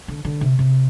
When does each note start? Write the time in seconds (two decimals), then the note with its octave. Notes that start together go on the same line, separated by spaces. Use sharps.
0.08 D3
0.25 D3
0.41 C3
0.59 C3